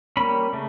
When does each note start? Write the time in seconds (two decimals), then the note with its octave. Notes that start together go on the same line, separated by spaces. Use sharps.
0.17 G3 A#3 C#4 B5
0.53 C#3 A3